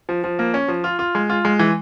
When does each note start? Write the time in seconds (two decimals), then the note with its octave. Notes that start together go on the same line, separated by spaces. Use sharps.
0.09 F3
0.24 F3
0.39 A#3
0.54 C#4
0.68 F3
0.84 F4
0.99 F4
1.15 G#3
1.29 F4
1.45 G#3
1.59 E3